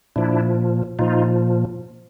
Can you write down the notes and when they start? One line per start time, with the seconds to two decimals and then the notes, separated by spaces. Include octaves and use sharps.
0.16 A#2 F3 D4 E4
0.99 A#2 F3 D#4 F4